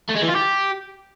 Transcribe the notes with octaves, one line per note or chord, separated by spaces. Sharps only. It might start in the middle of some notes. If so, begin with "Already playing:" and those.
A3
G#3
E3
F4
G4